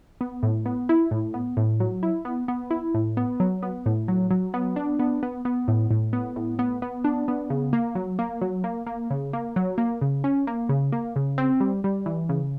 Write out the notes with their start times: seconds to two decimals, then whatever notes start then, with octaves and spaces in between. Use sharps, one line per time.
0.21 B3
0.43 A2
0.66 B3
0.89 E4
1.11 A2
1.34 B3
1.57 A2
1.80 F#3
2.03 E4
2.25 B3
2.48 B3
2.71 E4
2.94 A2
3.17 B3
3.40 F#3
3.63 B3
3.86 A2
4.08 F#3
4.31 F#3
4.54 B3
4.76 D4
4.99 B3
5.23 B3
5.45 B3
5.68 A2
5.90 A2
6.13 B3
6.36 A2
6.59 B3
6.82 B3
7.04 D4
7.28 B3
7.50 C#3
7.73 A#3
7.95 F#3
8.19 A#3
8.41 F#3
8.64 A#3
8.86 A#3
9.10 C#3
9.33 A#3
9.56 F#3
9.78 A#3
10.01 C#3
10.24 C#4
10.47 A#3
10.69 C#3
10.92 A#3
11.16 C#3
11.38 C4
11.60 G3
11.84 G3
12.06 E3
12.29 C#3